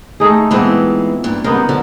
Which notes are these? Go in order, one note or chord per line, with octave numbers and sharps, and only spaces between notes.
A3 D#4 G#4
A#2 E3 G#3 B3 C4
G2 A#2
C#3 G3 B3 D#4 A#4
D3 F3